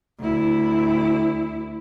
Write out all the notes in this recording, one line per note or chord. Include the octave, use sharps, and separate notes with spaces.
D2 E4